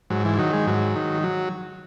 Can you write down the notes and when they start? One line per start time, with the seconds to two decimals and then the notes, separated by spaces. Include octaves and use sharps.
0.10 G#2 F#3
0.25 E3
0.39 D#3 F#3
0.53 G#3
0.67 G#2 F#3
0.96 D#3
1.23 F#3